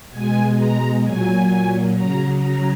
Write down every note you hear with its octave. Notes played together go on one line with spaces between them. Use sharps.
B2 G#3 G#5
A#5
A#2 F#3 G#5
C#3 F#3 A#5
A#5